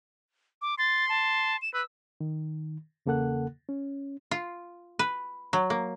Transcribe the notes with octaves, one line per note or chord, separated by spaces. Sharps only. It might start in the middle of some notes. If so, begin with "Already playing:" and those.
D6
C6 A6
A5
E7
B4 E6
D#3
E2 C#3 A#3 A4 F#5 F#6
C#4
F4
B4
F#3
A#3